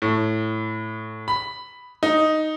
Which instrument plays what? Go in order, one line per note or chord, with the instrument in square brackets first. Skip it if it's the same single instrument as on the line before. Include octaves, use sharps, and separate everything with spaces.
[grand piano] A2
B5
D#4